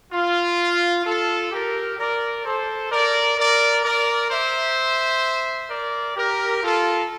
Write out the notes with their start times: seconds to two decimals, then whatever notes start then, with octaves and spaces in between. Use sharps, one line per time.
0.13 F4
1.05 F4 A4
1.52 G4 A#4
1.98 A#4 D5
2.45 A4 C5
2.91 A#4 D5
3.38 A#4 D5
3.84 A#4 D5
4.31 C5 E5
5.70 A#4 D5
6.17 G4 A#4
6.63 F4 A4